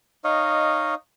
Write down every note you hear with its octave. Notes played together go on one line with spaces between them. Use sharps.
D#4 C#5 D#5 F5